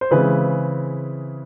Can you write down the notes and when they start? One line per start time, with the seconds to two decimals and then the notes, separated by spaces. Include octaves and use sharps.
0.01 C5
0.11 C#3 E3 G#3 C4 B4